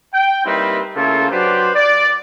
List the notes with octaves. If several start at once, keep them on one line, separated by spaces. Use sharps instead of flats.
G5
G3 A#3 C4 D#4 E4 B4
C#3 A3 A#3 E4 F4 A4
F#3 D4 G4 B4 C5
D5